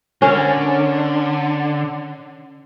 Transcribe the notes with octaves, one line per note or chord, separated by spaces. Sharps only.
D3 C#4 A#4